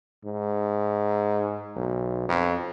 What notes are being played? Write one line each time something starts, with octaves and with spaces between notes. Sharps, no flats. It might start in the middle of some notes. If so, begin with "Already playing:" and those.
G#2
B1
F2